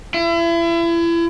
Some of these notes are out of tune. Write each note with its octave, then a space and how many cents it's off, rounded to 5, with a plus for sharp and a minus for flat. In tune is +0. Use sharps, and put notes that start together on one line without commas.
E4 +35